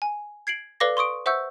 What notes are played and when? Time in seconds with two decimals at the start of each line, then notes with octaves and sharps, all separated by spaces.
0.02 G#5
0.47 G#6 C7 D7 F#7
0.80 A4 B4 D5 F5 D6 A#6
0.97 C6 C#6 D#6 D7
1.26 C5 E5 F#5 C#6 E6 G6